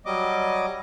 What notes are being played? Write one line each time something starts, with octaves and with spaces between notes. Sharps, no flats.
F#3 G3 D#5 D6